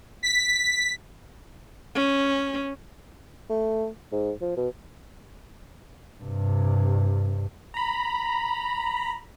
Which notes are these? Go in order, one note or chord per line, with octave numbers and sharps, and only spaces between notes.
B6
C#4
A3
G#2
F3
B2
G2 C3
A#5 B5